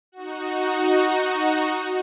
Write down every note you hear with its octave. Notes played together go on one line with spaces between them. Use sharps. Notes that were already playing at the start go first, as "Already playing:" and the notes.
D#4 F#4